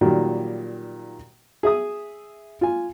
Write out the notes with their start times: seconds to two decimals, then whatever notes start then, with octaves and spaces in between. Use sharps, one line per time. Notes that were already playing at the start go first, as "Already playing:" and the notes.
0.01 A#2 D#3 F#3 G3 A#3
1.63 G#4 E5 D#6
2.61 F4 G#5